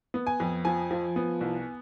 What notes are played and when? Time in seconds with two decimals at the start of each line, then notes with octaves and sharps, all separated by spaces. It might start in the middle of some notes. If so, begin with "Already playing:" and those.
0.14 B3
0.27 G#5
0.40 F2
0.65 F3 G#5
0.91 F3
1.16 B3
1.41 C2